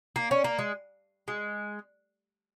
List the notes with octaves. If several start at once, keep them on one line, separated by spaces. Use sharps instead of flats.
A#3
C#4
A#3
G#3
G#3